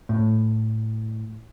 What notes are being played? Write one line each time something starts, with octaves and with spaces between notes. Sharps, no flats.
A2